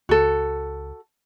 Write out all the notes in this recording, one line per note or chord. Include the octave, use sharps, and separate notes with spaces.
C#2 F#4 A4